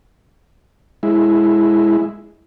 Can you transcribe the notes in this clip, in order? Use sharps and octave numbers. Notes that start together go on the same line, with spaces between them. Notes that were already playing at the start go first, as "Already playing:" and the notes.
G#3 E4